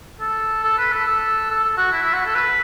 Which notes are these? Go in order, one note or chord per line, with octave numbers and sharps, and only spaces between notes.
A4
A4
B4
A4
A4
A4
A4
F#4
E4
E4
F#4
A4
B4